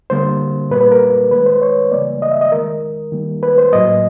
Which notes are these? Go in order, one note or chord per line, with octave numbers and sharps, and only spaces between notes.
D3 G3 A#3 C5
A#2 G3 A#3 B4
B4
A#4
D#3 G#3 B4
C5
C#5
C#3 E3 G3 A#3 D5
D#5
E5
D#5
D#3 G#3 A#4
D#3 G3 A#3
B4
C5
A2 F#3 A#3 D#5